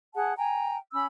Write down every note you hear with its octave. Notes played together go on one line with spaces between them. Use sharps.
G#4 F#5 A5
G5 G#5 A#5
C#4 B5 E6